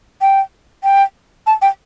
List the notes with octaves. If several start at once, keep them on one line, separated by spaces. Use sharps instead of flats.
G5
G5
A5
G5